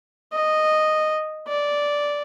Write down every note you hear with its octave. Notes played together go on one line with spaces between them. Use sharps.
D#5
D5